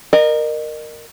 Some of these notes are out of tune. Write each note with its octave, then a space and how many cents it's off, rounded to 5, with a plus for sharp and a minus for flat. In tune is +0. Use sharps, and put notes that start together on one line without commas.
A#4 +0 D#5 -35